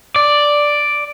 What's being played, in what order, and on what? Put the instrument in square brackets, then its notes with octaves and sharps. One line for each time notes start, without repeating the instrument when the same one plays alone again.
[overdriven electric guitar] D5